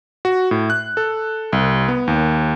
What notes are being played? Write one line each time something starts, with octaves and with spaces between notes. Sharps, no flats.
F#4
A2
F#6
A4
C2
B3
D#2